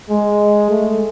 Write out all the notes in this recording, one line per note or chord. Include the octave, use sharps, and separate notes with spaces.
G#3
A3